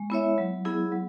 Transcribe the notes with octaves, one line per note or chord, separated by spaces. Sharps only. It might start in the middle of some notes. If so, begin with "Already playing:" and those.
Already playing: G#3
B3 E4 C#5 E5
F#3
B3 E4 G#4
F#3